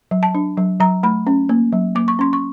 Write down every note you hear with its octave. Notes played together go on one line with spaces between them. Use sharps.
F#3
A5
D4
F#3
F#3 A#5
A3 B5
C#4
A#3
F#3
A#3 D6
C#6
C#4 C6
C#6